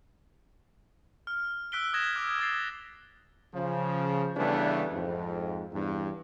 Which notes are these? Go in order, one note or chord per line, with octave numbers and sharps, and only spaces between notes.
F6
E6 F#6 B6 D7 G7
D#6 F#6 G#6 A#6 E7
D6 F6
D#6 A6 C7
C#3 F3
C#3 E3 G3 A3 B3 D4
F2 G#2
E2 G2